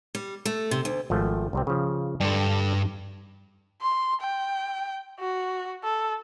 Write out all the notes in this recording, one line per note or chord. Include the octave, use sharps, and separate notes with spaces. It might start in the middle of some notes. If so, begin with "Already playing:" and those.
G3
A3
C3
D2
G#1 F3 A3
C2 C3 C4
C#3 F3
G2 D3 G3
C6
G5
F#4
A4